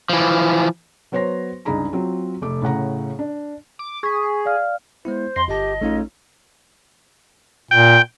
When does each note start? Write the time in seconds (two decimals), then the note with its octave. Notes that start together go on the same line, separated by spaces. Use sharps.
0.10 E3 F3
1.12 F#3 B3 C5 C#5 C6 A#6
1.65 C#2 G2 D#4 G#4 A#5 B5
1.93 F#3 C4 F4
2.41 F1 A3 D6
2.62 A2 C#3 F#5 A#5
3.19 D4
3.79 D6
4.03 G#4 C#6 B6
4.45 D5 F5 F6
5.05 G#3 B3 E4 C5
5.36 F2 C6 A#6 C7
5.48 G1 G4 D#5 A5
5.81 A#1 A3 C#4 D#4 F4
7.71 A#2 G5